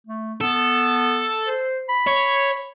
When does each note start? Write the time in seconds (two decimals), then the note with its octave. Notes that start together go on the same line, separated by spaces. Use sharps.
0.07 A3
0.41 B3 A4
1.46 C5
1.89 B5
2.07 C#5